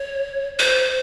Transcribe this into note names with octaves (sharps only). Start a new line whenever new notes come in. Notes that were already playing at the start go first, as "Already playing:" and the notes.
Already playing: C#5
C5